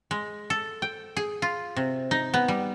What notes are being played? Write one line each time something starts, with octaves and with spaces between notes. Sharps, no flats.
G#3
A4
G5
G#4
F4
C3
D#4
B3
G3